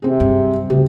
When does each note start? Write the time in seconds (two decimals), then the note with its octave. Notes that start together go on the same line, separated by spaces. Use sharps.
0.02 C3 C4 G#4
0.20 G2 F#3
0.70 D2 C#3 D#4 G4